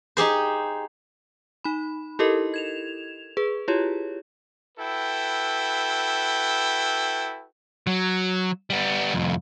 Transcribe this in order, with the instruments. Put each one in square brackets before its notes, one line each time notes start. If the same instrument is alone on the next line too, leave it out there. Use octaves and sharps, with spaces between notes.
[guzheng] D#4 G4 G#4 C5
[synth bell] D#4 B5
E4 G4 A4 A#4 D#5
G#6 E7 F7
G#4 B4
E4 F4 G4 C#5
[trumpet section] E4 F#4 A4 B4 G5
[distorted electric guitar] F#3
G3 B3
C2 F2